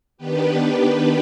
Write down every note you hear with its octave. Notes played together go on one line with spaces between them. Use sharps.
D#3 B3 D4 G4 B4